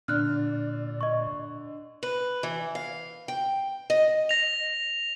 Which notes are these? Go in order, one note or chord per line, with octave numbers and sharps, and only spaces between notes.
A#2 D3 D5 F6 F#6
D#5 C#6
B4
E3
F5
G5
D#5
A#6 F7